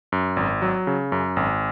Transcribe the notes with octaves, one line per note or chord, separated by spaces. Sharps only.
F#2
G#1
F#3
C#3
F#2
G#1